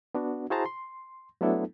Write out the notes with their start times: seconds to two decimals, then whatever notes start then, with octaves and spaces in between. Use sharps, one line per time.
0.15 B3 D4 F#4
0.50 E4 F#4 G#4 C5 A5 A#5
0.66 C6
1.41 F#3 A3 B3 D4 E4 A4